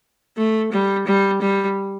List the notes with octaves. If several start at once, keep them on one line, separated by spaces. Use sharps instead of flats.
A3
G3
G3
G3